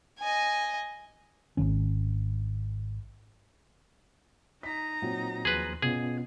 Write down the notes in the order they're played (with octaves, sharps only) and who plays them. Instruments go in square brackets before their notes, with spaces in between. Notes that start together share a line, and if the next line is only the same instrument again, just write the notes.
[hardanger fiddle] D#5 G#5
[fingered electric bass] G#1 D#2 D#3 C#4
[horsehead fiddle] D#4 A#5 [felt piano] B6
[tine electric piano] A#2 C4 [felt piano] F#3
[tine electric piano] D#2 F3 C6 [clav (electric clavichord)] G#4 B4
[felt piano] B2 [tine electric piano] B3 C#4 F4 [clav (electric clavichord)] G#4